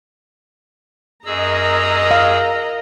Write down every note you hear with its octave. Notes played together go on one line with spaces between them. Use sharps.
F#2 G#4 A#4 D#5 A#5 E6
F5